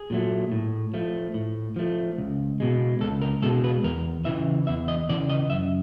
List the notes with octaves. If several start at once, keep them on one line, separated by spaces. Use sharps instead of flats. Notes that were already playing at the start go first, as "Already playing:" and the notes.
Already playing: G#4
A#2 F#3 A3
A2
F3 A3
A2
F3 A3
C#2
B2 G#3
C#2 A4
A#4
B2 G#3 A4
B4
E2 A#4
C#3 E3 E5
E2 E5
D#5
C#3 E3 D5
D#5
F#2 E5